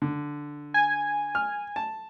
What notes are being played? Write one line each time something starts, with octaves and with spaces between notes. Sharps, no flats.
D3
G#5
F6
A5